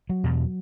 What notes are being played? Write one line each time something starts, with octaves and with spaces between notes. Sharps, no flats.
F#3
E2 B2